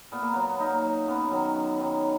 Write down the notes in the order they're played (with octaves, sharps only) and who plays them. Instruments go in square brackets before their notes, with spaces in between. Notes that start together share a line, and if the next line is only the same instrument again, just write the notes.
[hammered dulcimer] A#2 B3
A#3
F#3 B3
A#2 D#4
F#3
F#2 B3
D#3 F#3
F#2
D#3 F#3